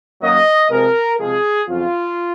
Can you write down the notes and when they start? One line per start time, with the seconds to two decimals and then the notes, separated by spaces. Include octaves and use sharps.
0.22 F#2 D#3 F#3 A#3 D#5
0.70 C3 F3 G#3 A#4
1.19 C3 F3 G#3 G#4
1.68 F2 C#3 F#3 F4